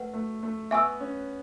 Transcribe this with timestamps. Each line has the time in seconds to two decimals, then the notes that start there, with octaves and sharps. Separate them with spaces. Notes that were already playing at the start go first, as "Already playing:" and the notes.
Already playing: A3 B4 F#5
0.13 A3
0.43 A3
0.71 B3 E5 G#5 C#6 E6
1.00 C#4